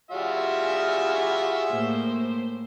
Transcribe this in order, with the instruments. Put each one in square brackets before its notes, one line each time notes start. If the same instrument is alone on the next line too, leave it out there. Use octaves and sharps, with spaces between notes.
[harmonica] G3 F4 F#4 [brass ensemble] G#4 E5
[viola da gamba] A2 A#3 C5